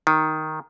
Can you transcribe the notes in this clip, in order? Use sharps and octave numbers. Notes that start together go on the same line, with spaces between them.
D#3